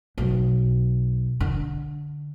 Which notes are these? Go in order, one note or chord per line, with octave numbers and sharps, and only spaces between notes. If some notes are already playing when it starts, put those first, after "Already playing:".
B1
D3